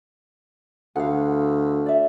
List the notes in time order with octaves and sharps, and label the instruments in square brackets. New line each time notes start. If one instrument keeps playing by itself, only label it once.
[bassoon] D2 [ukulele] F5 F#5
[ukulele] D5 E5